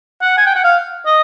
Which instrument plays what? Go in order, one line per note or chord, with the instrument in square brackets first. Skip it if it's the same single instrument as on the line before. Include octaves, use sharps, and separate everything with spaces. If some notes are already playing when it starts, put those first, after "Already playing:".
[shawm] F#5
G#5
G5
F#5
F5
D#5